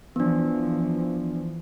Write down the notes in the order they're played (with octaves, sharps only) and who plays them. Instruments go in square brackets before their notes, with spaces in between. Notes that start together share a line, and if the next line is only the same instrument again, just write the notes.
[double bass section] E3 F3 [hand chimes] B3 D4